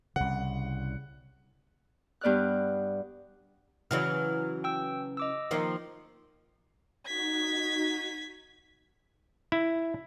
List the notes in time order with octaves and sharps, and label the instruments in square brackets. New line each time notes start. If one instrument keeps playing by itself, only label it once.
[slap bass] C2 C#3 [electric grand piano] F#5
[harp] G2 B3 D5 F6 F#6
[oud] C#3 E3 F#3 [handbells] F6
[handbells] G5 E6
D#5 D6 E6
[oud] D#3 F3 A#3
[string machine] D#4 F#4 [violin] G#6 B6
[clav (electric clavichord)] E4